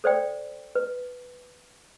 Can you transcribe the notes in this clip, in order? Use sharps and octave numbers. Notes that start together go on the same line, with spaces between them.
A4 C5 D5 G5
B4